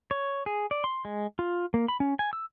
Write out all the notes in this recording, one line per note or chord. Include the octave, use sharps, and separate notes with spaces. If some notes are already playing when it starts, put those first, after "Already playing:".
C#5
G#4
D5
C6
G#3
F4
A#3
B5
C#4
G#5
E6